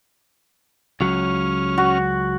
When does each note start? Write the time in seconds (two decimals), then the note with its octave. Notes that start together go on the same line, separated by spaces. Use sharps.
1.01 C#2 F#3 C#4 F6
1.78 F#4